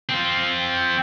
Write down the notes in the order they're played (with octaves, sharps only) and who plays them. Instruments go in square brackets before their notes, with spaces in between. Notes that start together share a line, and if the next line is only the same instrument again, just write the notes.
[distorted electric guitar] C4 F4